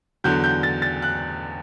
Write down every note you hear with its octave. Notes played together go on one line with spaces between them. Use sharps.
E2 D3 F#3 G6
G6
A6
A6
F#6